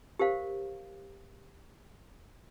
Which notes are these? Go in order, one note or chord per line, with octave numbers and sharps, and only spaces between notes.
G4 A#4 C5 F5